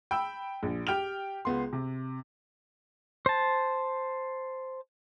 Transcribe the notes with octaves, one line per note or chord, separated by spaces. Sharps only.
G5 B5 E6
A#1
G4 G5 F6 F7
C#2 B3 C6
C3
C5 A5